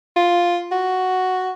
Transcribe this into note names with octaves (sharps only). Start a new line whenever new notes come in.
F4
F#4